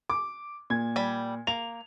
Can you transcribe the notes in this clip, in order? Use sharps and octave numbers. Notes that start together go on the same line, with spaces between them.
D6
A#2 G#6
G3 B5
A#3 F7